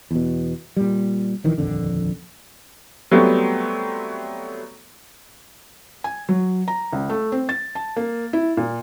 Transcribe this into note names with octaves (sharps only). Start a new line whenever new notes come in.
E2 B2
A#2 G3
A#1 D#3 E3
D#1 A#1 F2 D3
F#3 G3 A3 B3 C4
G#5
F#3
A#5
C#2
A3
C4
A6
A5
A#3
E4
A#2